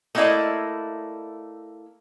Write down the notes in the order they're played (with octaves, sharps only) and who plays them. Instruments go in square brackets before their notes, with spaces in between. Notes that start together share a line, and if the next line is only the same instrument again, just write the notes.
[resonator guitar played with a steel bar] A3 A#3 D4 E4 D5 D#5